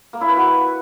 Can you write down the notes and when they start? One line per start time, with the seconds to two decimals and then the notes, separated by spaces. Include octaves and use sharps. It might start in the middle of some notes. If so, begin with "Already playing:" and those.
0.13 A#3
0.21 E4
0.29 B4
0.37 F#4